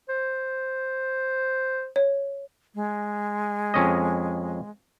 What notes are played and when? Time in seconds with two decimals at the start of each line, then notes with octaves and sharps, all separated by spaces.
0.09 C5
1.96 C#5
2.75 G#3
3.74 F2 C#4 D#5